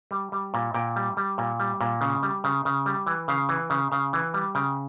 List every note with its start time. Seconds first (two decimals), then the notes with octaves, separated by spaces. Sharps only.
0.11 G3
0.32 G3
0.54 A#2
0.74 A#2 G5
0.96 G3
1.17 G3
1.38 A#2
1.60 G3
1.81 A#2
2.01 C#3
2.23 G3
2.44 C#3
2.65 C#3
2.86 G3
3.07 E3
3.28 C#3 F5
3.49 E3
3.70 C#3
3.91 C#3 F5
4.13 E3
4.34 G3
4.55 C#3 G5